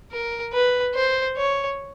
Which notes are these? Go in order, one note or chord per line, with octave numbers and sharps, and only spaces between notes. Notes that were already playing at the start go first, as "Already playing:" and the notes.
A#4
B4
C5
C#5